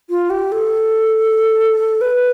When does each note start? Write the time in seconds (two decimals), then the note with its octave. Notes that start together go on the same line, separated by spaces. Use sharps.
0.10 F4
0.30 G4
0.52 A4
2.01 B4